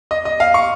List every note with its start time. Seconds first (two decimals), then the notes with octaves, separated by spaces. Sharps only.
0.11 D#5
0.25 D#5
0.40 F5
0.54 C#6